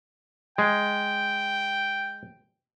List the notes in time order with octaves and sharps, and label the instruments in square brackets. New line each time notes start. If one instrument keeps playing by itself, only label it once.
[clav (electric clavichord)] G#3 [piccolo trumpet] G5